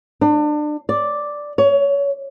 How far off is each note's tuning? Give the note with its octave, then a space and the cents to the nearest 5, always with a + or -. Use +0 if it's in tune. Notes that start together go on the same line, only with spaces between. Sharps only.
D4 +30
D5 +0
C#5 +25